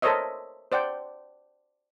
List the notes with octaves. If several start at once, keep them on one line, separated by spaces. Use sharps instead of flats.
A4 A#4 C5 C#5 D#5 E5
C5 D5 F#5 G5